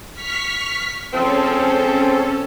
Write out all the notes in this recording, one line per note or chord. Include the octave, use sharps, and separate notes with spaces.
C#6 F6 B6
F3 G#3 C4 C#4 A4